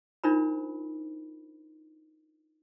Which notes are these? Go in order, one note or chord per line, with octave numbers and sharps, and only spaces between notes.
D4 D#4 F4 A#4 C5 B5